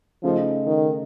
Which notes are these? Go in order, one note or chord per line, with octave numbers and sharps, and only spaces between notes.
C#3 F3 A3 D#4
D#3